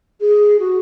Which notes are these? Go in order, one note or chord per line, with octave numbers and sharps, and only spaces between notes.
G#4
F#4